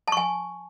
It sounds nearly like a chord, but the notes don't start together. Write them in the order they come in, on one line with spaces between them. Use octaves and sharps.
A5 C#6 G#5